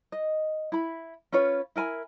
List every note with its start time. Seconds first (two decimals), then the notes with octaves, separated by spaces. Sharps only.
0.12 D#5
0.72 E4 B5
1.32 C#4 F4 B4 C#5
1.76 E4 A#4 G#5 B5